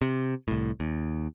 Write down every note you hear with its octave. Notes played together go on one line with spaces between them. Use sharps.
C3
C2 A2
D#2